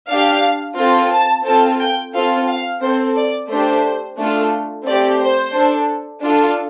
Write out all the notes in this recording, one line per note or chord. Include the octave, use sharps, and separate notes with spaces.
D4 G4 F5
C4 F4 A4
A5
C4 F4 A4 A5
G5
C4 F4 A4 F5
F5
C4 A4 C5
D5
A3 D4 G4 C5
A3 D4 F4 A4
A3 C4 G4 D5
C5
D4 A4
D4 F4 A4